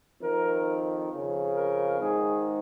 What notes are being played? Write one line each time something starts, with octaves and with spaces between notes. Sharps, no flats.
F2 D#3 A#4
F2 C#3
A#4
G#2 D#3 G#4